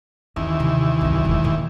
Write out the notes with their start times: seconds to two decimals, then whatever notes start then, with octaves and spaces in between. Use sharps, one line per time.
0.36 D#2 E3 C#4
0.60 C3
1.01 C2 F#2
1.20 E1 F4
1.44 A#2 A#3